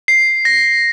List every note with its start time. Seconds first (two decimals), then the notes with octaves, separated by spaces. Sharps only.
0.08 C7
0.45 A#6